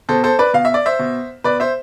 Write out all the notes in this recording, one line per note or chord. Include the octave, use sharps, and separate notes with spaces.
B2 A4 C5
A4 C5
B4 D5
B2 F5
E5
D5
C5 E5
B2
B2 B4 D5
C5 E5